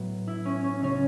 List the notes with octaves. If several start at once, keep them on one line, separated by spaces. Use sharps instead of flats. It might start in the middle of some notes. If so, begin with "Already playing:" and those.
Already playing: A2 F#3 B3
E4
C#4
C#4
C#2 C#3 F#3 C#4